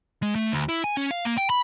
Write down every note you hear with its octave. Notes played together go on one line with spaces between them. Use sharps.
G#3
A3
D2
E4
G#5
C#4
F5
A#3
G5
B5